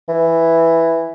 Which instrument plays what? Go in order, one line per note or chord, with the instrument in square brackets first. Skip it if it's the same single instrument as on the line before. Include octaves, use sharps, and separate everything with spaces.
[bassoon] E3